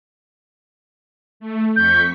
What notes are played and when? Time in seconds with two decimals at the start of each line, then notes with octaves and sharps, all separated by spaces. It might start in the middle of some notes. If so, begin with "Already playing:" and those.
1.40 A3
1.76 F2 C#6 G6 B6